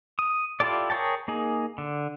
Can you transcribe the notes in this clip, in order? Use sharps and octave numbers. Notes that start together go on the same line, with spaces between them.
D#6
E4 F4 G4 A4 D5
G#4 A#4 C#5 G5 A5
A#3 D#4 G#4
D3